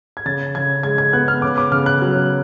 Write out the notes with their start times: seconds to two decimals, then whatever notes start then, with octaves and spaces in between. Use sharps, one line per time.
0.17 G#6
0.26 C#3 A6
0.55 C#3 G#6
0.83 G#3 G#6
0.98 G#6
1.13 B3 F#6
1.28 F6
1.42 C#3 D6
1.58 D6
1.72 C#3 F6
1.86 F#6
2.02 F#3